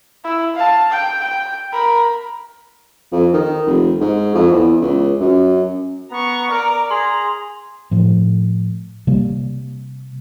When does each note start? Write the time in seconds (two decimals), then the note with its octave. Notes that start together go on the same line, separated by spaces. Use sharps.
0.24 E4
0.55 F5 A5
0.91 G5
1.23 G5
1.72 A#4 B5
3.12 F2
3.33 D#3
3.66 F1
4.00 G#2
4.35 F2
4.51 E2
4.82 C#2
5.20 F#2
6.11 B3 A#5 C#6
6.51 A#4 D5 A#5
6.91 G#4 A#5 C6
7.91 A2 F3
9.07 C3 G3 A#3